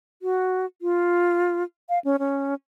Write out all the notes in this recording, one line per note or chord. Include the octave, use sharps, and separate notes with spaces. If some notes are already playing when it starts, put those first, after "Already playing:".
F#4
F4
F5
C#4
C#4